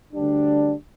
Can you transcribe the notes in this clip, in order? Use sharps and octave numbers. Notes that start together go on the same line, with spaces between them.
D2 D3 G3 D4